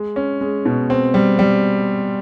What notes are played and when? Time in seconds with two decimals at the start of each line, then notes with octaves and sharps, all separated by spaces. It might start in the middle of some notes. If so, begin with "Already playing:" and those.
Already playing: G#3
0.16 C#4
0.41 G#3
0.65 B2
0.90 C4
1.14 G3
1.39 G3